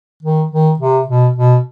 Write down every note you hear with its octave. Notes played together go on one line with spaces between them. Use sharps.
D#3
D#3
C3
B2
B2